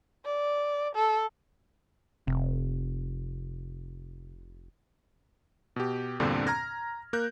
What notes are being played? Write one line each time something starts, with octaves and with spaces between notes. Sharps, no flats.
D5
A4
F1 C3
B2 G4
E2 G2 A#2 D3 C4 D4
A#5 F6 G#6 A#6
A#3 A#4 F#6 G6